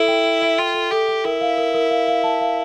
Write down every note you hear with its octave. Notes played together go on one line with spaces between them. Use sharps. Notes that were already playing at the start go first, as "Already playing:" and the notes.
Already playing: E4 A4
G5
G5
E5
F4 G5
A4
G4 A4
G5
E4 A#4
F5
A#4
A#4
F5
F5
A5
F5